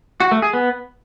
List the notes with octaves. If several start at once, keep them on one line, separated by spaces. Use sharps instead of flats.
F#4
A3
G#4
B3